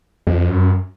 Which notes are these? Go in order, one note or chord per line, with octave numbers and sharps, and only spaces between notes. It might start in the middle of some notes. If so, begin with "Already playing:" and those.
F2
F#2